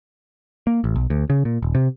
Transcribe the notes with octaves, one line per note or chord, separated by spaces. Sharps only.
A#3
A1
B1
D2
C#3
A#2
D#1
C3